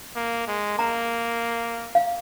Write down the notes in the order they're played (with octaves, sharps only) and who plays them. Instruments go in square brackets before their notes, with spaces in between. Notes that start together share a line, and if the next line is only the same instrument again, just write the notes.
[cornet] A#3
G#3
[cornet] A#3 [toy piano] A#5
[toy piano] F5